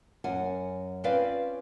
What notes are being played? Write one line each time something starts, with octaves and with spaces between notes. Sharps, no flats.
F#2 F#5 G#5
C4 C#4 F4 B4 D5 F5